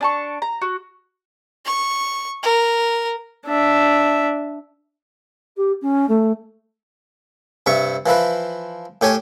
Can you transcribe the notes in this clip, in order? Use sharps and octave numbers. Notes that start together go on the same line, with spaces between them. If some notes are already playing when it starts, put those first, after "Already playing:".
D4 A5 C#6
A#5
F#4
C#6
A#4
D4 E5
G4
C#4
A3
G2 C3 E5 C#6
E3 F3 E4 B4
A2 G4 C#5 G#5 A5